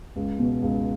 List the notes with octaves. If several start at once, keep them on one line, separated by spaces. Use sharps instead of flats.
C#2
B2
C#2